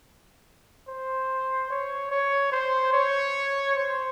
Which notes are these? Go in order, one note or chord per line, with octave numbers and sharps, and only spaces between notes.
C5
C#5
C#5
C5
C#5
C5